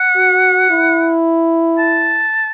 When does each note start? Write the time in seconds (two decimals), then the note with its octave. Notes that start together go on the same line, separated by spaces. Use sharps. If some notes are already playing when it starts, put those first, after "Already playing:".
Already playing: F#5
0.16 F#4
0.70 E4
1.78 A5